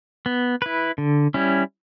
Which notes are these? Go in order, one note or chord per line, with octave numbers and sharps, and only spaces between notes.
B3
E4 B4
D3
G3 C#4 E4